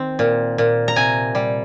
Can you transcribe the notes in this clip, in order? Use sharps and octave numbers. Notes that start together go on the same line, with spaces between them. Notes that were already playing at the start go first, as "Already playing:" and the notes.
Already playing: D#3 C4
A#2
A#2
A#5
C3 G#5
G3